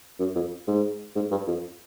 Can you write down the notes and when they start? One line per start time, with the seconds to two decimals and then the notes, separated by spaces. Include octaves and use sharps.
0.19 F#2
0.35 F2
0.67 G#2
1.15 G#2
1.31 G2
1.47 F2